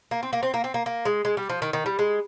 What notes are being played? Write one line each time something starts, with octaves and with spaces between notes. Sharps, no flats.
A#3
C4
A#3
C4
A#3
C4
A#3
A#3
G#3
G#3
G3
F3
D#3
D#3
G3
G#3